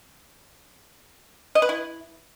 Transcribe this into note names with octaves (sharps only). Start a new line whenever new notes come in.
D#5
B4
E4